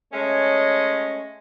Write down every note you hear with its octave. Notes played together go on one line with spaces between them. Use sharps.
G#3 A3 C#4 C#5 D#5